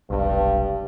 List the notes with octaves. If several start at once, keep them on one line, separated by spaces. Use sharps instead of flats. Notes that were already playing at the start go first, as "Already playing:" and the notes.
F1 B1 G2